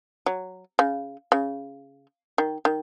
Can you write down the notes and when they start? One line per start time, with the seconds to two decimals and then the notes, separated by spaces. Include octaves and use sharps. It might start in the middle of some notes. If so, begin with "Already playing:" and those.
0.26 F#3
0.79 C#3
1.32 C#3
2.38 D#3
2.65 D#3